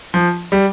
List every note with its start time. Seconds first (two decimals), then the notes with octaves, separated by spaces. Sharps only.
0.14 F3
0.52 G3